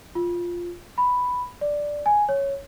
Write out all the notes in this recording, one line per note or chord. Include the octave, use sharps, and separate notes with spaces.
F4
B5
D5
G#5
C#5